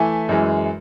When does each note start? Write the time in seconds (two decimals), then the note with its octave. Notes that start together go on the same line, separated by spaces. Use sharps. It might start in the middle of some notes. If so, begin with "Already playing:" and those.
Already playing: E3 A3 E5 G#5
0.29 F#2 E3 G#3